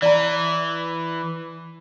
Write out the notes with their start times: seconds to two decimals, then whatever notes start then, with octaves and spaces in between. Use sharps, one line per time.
0.02 E3 D5 A#5